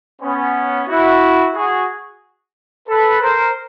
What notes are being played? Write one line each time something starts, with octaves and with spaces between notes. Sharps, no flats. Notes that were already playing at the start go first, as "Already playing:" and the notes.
B3 C#4
E4 F#4
F#4 G#4
A4 B4
A#4 C5